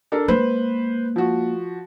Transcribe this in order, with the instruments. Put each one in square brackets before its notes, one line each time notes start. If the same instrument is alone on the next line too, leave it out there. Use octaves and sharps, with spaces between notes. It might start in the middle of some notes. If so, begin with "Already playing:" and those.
[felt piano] D4 A4 A#4
[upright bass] G#3 A#3 [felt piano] B4 C5
[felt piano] F3 F#4